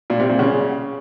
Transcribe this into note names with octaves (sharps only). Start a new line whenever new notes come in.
A#2
C3
A#2
C#3